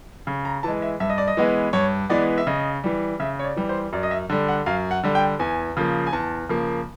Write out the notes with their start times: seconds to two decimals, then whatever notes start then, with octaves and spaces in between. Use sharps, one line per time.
0.27 C#3
0.45 A#5
0.63 E3 G#3 A5
0.82 E5
1.00 G2 E5
1.10 D#5
1.18 D5
1.28 D#5
1.37 E3 G#3 B3
1.73 G2 C#5
2.10 E3 G#3 B3 D5
2.38 E5
2.47 C#3 D#5
2.84 E3 G3
3.20 C#3 E5
3.39 C#5
3.44 D5
3.57 E3 G3
3.69 C5
3.93 F#2 D5
4.03 D#5
4.11 E5
4.30 D3 G3
4.48 F#5
4.66 F#2 F5
4.91 F#5
5.03 D3 G3
5.15 G5
5.39 E2 G#5
5.77 C#3 F3 A#3
6.07 G#5
6.13 E2 A5
6.49 C#3 F3 A#3